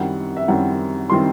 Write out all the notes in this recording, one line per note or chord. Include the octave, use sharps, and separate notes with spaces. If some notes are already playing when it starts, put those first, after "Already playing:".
Already playing: F#2 D#3 G3 C4 E4 F#5
E5
F#2 D#3 G3 C4 E4 F#5
D#3 G3 C4 E4 C6